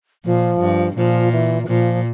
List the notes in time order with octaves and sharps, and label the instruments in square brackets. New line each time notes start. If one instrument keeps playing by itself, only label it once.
[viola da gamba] A#2 [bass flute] F3
[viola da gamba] G2
[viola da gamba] A#2 [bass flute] F3
[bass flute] E3
E3
[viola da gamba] A#2 [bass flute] F3